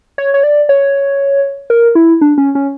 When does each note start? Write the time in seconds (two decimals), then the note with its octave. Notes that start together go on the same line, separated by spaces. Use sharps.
0.18 C#5
0.34 C#5
0.44 D5
0.69 C#5
1.70 A#4
1.95 E4
2.21 D4
2.38 C#4
2.55 C#4